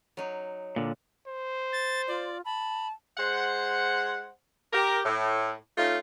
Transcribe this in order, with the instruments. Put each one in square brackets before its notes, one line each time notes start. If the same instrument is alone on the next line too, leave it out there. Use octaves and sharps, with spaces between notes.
[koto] F#3 D#4
[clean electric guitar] A#2 D3
[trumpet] C5
[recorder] A6
[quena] F4 [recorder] D5
[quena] A5 [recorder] B5
[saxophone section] G#3 C5 F#5
G4 A#4
A2
A3 C#4 D#4 F4